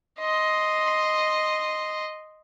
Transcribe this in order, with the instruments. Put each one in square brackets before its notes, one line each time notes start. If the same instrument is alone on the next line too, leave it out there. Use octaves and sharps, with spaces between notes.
[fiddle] D#5 C6